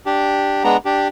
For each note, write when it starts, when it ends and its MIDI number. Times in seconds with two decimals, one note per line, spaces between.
0.06 0.64 62
0.06 0.64 67
0.64 0.77 56
0.64 0.77 59
0.64 0.77 62
0.64 0.77 82
0.85 1.08 62
0.85 1.08 67